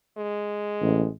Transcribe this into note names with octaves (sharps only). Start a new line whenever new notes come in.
G#3
A1